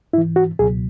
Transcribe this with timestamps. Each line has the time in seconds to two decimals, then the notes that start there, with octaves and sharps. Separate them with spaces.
0.13 G#2 E4
0.18 E3
0.36 F#4
0.59 C#2 B2 F#3 G#4